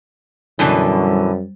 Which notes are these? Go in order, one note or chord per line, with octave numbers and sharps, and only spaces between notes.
F#2 B2 D3 E3 G3 C#6
G3 C5